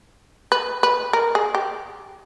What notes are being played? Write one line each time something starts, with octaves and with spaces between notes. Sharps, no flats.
B4
B4
A#4
G#4
G4